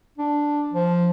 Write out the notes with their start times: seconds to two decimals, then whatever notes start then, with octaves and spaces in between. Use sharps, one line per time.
0.18 D4
0.73 F3